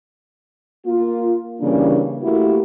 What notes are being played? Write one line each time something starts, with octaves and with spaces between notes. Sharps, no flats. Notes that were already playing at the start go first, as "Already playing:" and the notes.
A#3 F4
C#3 E3 G3 A#3 C#4 D4
A3 A#3 E4 F#4 G4